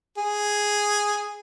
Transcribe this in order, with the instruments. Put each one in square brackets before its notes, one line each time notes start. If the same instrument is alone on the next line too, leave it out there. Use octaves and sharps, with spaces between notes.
[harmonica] G#4